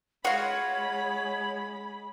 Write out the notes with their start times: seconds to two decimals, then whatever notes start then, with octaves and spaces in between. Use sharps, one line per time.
0.25 G#3 C#4 F4 F#4 C#5 F5 F#5 B5